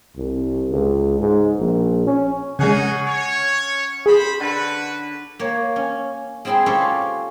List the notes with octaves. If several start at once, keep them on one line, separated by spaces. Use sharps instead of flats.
C2
C#2
G#2
A#1
C#4
C#3 G#3 C#4 D#4 F#4 G#4 F#5 G#5
C#5 E6
G#4 C5 B5
D3 F#4 B4
A#3 C#5
C#4
G#3 C4 E4 G#4 G5 C6
C#4 F4 G4 A4 C5 C#5